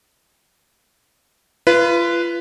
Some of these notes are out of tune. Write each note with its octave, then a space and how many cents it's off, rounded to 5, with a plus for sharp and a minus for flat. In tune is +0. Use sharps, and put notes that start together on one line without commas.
F4 -35 B4 +0